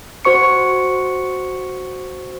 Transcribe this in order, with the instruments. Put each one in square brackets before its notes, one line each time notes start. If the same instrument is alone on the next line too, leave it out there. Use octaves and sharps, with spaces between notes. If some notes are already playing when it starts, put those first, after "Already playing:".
[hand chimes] F#4 C5 C#6 C#7